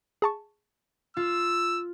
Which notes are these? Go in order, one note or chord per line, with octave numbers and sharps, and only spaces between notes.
G#4 A5 C#6
F4 E6